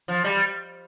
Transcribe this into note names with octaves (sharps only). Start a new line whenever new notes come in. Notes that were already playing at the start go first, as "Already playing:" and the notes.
F3
G3